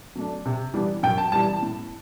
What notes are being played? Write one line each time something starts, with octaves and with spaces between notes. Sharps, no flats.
F#3 A3 D4
C3
E3 G3 B3 D4
F#2 G5
A5
E3 G3 A5
A5
A2